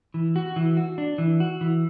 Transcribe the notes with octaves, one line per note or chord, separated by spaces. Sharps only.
E3
F#4
E3
F#4
D4
E3
F#4
E3